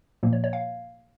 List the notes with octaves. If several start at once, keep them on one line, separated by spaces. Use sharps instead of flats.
A#2 F3 A#3
C#5
C#5
F5